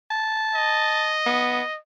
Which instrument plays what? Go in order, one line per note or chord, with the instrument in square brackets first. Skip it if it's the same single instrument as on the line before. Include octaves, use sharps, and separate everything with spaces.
[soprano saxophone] A5
[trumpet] D#5
[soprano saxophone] B3